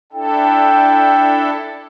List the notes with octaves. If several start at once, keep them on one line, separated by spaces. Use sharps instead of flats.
D4 E4 A4 G5